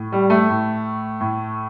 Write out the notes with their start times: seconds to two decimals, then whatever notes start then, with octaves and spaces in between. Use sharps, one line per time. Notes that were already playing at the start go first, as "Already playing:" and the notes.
Already playing: A2
0.12 G3
0.30 A3
0.49 A2
1.21 A2